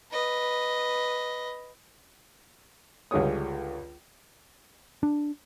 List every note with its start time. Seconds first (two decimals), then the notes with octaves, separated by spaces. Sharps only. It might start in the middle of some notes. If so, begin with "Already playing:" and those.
0.11 B4 D#5
3.11 C#2 D3 G3 G#4 C#5 D#6
5.03 D4